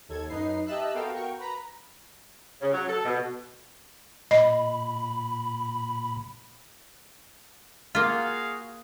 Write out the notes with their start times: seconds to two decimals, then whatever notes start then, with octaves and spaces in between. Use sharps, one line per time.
0.08 D#2 A4 G#6
0.28 F#2 D#4 B4 C7
0.66 G4 D#5 E5 A5 E6 F#6
0.94 B3 F#4 A4 A#4 F5 G5
1.13 F#4 A#4 G5 C#6
1.39 B4 A#5 B5
2.61 C#3
2.73 F#3
2.88 A4
3.05 B2
4.31 A#2 D#5 B5
7.95 A#3 F4 F#4 G#4 F5